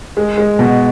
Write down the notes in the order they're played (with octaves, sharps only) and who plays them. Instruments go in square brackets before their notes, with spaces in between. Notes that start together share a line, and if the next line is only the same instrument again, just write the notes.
[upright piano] G#3
G#3
B2